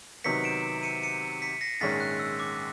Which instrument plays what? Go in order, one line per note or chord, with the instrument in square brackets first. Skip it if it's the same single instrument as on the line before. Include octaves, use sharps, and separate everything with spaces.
[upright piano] C3 D#3 F#3 B3 D#4 [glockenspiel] B6 C#7
[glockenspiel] D7 E7
C#7 D#7
C#7 D#7
B6 C#7
A#6 C7
[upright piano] A#1 G#2 D#3 G#3 C#4 [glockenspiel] A6 B6
[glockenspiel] F#6
E6
D6